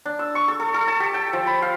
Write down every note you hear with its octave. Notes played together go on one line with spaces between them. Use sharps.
D4
E6
C#6
A4
A4
A4
A5
G4
G5
F3
B5
F5